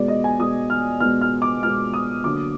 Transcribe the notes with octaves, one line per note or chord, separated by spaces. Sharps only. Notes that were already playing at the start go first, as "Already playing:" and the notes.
Already playing: B2 G#3 B3 D5
D#5
G#5
B2 G#3 B3 D#6
F6
B2 G#3 B3 F6
F6
D6
B2 G#3 B3 F6
D#6
D3 F#3 A#3 D6